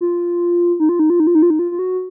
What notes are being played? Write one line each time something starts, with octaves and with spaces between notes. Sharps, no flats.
F4
D#4
F4
D#4
F4
D#4
F4
D#4
F4
D#4
F4
F4
F#4